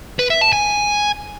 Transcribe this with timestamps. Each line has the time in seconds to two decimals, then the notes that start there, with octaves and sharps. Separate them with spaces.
0.19 B4
0.30 E5
0.41 A5
0.53 G#5